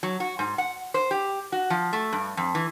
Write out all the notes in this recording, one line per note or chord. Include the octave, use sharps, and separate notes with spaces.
F#3
F#4
G#2
F#5
C5
G4
F#4
F3
A3
G2
F2
E3